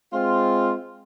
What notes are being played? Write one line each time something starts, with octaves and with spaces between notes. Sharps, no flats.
G#3 C4 F4